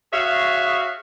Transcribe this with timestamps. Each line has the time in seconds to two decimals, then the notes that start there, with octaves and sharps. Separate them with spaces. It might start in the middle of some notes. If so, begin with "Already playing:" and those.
0.13 F#4 G#4 C#5 E5 F5